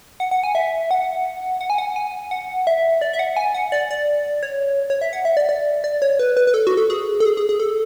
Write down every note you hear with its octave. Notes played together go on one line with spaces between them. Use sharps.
F#5
F#5
G#5
E5
F#5
F#5
G#5
F#5
G#5
F#5
E5
D5
E5
F#5
G#5
F#5
D5
D5
C#5
C#5
E5
F#5
E5
D5
D5
D5
C#5
B4
B4
B4
A4
F#4
A4
G#4
A4
G#4
G#4
G#4
A4